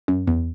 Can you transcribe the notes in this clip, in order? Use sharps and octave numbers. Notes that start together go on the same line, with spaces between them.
F#2
E2